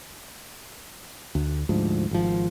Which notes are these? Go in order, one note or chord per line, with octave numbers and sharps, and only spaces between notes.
D2
D2 G#2 F3
G#1 F3